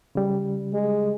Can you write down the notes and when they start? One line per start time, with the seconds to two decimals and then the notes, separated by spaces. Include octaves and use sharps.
0.15 C#3 G3
0.73 G#3